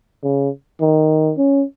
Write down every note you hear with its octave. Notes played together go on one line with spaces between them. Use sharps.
C#3
D#3
C#4